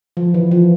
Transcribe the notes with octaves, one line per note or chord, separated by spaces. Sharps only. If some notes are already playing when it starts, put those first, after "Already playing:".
F3
E3
F3